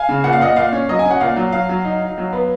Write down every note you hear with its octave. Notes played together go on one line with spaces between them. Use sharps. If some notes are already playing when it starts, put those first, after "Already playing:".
Already playing: F5 G#5
C#3
A#2 F#5
F5
A#2 D#5 F#5
A#2 F5
C#4
F#3 D#5
G#5
C#4
F#5
A#2 F5
F#3
F#3 F5
F#3
D#4
D#4
F#3
B3